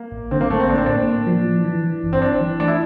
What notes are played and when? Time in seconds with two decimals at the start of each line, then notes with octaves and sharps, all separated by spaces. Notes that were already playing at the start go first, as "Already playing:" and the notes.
Already playing: A#3
0.12 A1
0.31 D3 C4
0.41 A#3
0.50 A1 A3
0.60 C4
0.69 A#3 D4
0.78 C4
0.86 A2 D4
1.07 A#3
1.27 F3
1.46 E3
1.64 E3
1.84 E3
2.03 G1
2.13 C4
2.22 E3 D4
2.41 E3
2.60 A3 D4
2.68 E4